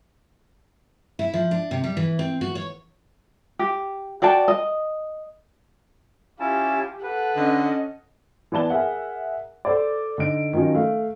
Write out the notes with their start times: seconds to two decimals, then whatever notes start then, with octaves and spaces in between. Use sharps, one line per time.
1.19 E4
1.34 F3
1.51 D4
1.71 C3
1.84 G3
1.97 E3
2.19 C4
2.41 F#4
2.55 C#5
3.59 G4
4.22 F#4 D5 G5 A5
4.48 D#5
6.40 C#4 E4 F4 G4 A5
7.03 A4 B4 F#5
7.36 D3 C#4 D#5
8.52 E3 B3 D5 A5 G7
8.70 G#4 A#4 E5 F#5
9.65 A4 C5 D5
10.18 D3 D#4 D7
10.53 D#3 F3 F#3 C#4 D#4
10.74 A3 F5